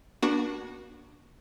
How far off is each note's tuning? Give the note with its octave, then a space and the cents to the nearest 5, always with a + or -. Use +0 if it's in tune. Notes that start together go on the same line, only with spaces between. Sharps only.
A#3 +45 D4 +0 F#4 +0